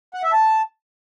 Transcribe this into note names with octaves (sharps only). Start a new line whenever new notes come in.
F#5
E5
A5